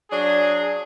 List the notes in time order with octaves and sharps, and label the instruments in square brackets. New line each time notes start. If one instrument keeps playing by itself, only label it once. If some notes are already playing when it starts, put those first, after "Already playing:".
[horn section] F#3 D4 G#4